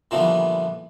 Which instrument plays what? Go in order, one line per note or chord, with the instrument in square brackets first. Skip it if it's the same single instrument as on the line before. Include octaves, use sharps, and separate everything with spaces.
[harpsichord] A#2 D3 E3 F3 G3 B3